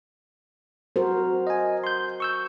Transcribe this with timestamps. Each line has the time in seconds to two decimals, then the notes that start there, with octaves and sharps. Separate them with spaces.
0.96 F#4 A#4 C5
1.47 D#5 G#5
1.84 C6 G6
2.20 C#6 E6 G6